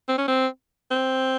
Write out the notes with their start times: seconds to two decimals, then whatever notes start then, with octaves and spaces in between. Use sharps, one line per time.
0.09 C4
0.18 C#4
0.28 C4
0.91 C4